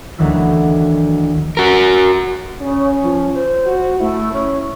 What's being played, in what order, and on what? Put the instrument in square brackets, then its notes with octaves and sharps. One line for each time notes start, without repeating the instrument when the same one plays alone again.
[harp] D2 D#3 E3 F#3 E4
[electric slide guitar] F#4 A#4
[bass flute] C#3 [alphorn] C#4
[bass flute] F3
C5
[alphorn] F#4
[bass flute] A3 [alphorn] E4
[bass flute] C#4